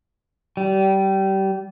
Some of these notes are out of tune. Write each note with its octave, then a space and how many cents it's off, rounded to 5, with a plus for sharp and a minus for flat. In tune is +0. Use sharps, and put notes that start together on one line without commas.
G3 -25